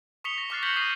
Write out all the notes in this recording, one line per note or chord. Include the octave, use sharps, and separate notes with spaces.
C#6 D#6 B6 C#7 F7 G7
A#6
C#6 D6 F6 F#6 A6 C7
G6 A#6 B6 C#7 F#7 G7
D#6 A#6 C7 D#7